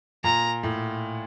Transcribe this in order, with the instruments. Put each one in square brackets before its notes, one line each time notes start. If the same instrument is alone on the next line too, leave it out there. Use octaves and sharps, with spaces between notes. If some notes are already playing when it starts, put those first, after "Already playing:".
[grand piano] A#2 [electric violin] A#5
[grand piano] A2